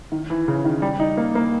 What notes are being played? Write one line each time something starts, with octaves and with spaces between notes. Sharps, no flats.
D#3
E3
C#3
D#3
G3
D#4
A#3
A#3